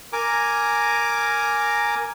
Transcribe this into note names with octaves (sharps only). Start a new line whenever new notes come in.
A#4 G#5 A#5 D6